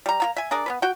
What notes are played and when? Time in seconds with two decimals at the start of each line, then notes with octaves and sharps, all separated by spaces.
0.06 G3 A#5
0.20 A#3 F4 A#5
0.36 E5 G#5
0.51 D4 G#4 A#4 D5
0.66 B3 C#4 B4
0.82 F#4 G5